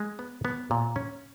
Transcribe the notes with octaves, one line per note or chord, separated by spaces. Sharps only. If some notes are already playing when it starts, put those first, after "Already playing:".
Already playing: G#3
B3
B3
A#2
C#4